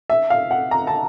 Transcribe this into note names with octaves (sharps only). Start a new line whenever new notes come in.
E5
F5
F#5
A#5
A5